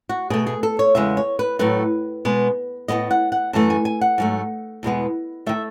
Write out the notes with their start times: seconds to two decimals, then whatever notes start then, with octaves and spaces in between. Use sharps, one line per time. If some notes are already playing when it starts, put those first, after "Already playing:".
0.09 F#4
0.30 B2 A3 G#4
0.47 G#4
0.63 A4
0.79 C#5
0.95 E2 C#3 G#3 B3 E5
1.17 C#5
1.39 B4
1.59 A2 F#3 A3 B4
2.25 B2 G#3 B3
2.88 A2 G#3 B3 D#5
3.11 F#5
3.32 F#5
3.53 F#2 E3 A3 A5
3.70 G#5
3.85 G#5
4.01 F#5
4.18 G#2 F#3 A3
4.83 E2 B2 G#3 B3
5.46 D#3 A3 E5